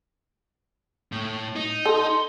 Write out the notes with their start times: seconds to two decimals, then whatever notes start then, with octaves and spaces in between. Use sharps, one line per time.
1.12 A2
1.56 D#4
1.85 A4 C6